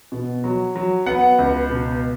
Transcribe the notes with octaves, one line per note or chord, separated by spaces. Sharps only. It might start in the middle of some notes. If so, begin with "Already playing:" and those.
B2
F#3
F#3
B3 F#5
C#2
B2